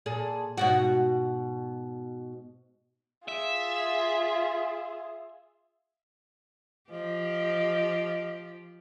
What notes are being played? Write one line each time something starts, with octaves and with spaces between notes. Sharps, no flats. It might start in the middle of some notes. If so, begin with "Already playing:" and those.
A#2 G#4 A4
G#2 B2 F#4
F4 G#4 E5
F3 G4 D#5